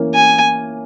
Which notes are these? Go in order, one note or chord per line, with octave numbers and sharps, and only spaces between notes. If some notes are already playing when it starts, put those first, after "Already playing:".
Already playing: E3 A#3 C#4
G#5